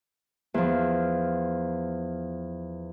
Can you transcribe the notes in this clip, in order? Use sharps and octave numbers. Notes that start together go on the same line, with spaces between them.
E2 F3